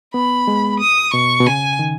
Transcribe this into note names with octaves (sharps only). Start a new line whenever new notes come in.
B3 B5
G#3
D#6
B2 C#6
B2
C#3 G#5
D#3